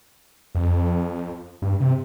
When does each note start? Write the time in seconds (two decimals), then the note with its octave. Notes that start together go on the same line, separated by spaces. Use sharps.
0.55 F2
1.62 G2
1.80 C3